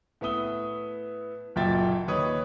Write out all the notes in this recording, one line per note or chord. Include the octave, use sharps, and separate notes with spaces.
A2 B3 E5 D#6 G7
F#1 B1 A#2 E5 G5 A6
D#2 D#4 B4 C#5 D#6